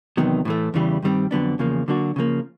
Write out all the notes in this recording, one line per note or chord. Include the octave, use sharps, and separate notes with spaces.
E2 C3 D#3 F#3 B3
A2 E3 A3
E2 C#3 E3 G3
G2 D#3 G3 C4
F2 D3 F#3 B3 D4
E2 C#3 F3 A#3
D3 F#3 A#3 D4 F#4
C#3 F3 A#3